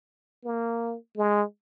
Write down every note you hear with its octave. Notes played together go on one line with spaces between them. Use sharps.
A#3
G#3